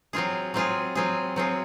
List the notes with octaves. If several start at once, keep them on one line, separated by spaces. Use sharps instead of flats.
F#3 C4 F4 G#4
F#3 C4 F4 G#4
F#3 C4 F4 G#4
F#3 C4 F4 G#4